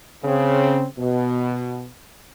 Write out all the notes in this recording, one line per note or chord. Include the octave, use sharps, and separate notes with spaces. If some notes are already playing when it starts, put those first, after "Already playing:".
C#3 C4
B2